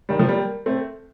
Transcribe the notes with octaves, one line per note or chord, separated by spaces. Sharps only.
D#3 G3
F3 A3
G3 A#3
A3 C4